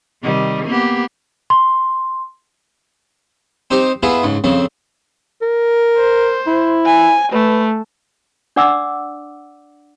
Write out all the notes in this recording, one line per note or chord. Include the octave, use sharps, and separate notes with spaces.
C3 D#3 G3
A#3 B3 G4
C6
C4 D#4 G4 C5
B3 E4 F4 G#4
C#2 G#2
F2 C#3 C4
A#4
C5
E4
G#5
A3 B4
D4 D5 F#5 D6 E6